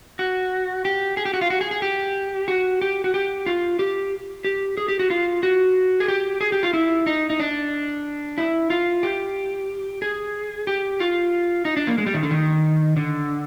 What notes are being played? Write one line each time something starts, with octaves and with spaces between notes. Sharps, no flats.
F#4
G4
G#4
G4
F#4
F4
F#4
G#4
G#4
G4
F#4
G4
F#4
G4
F4
G4
G4
G#4
G4
F#4
F4
F#4
G#4
G4
G#4
G4
F4
E4
D#4
D#4
D4
E4
F4
G4
G#4
G4
F4
D#4
D4
A#3
G#3
G3
D#3
D3
D#3
D3